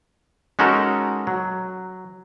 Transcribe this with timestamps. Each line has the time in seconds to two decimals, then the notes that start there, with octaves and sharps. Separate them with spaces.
0.59 G#3 C#4 D#4 F#4 A4 A#4
1.27 F#3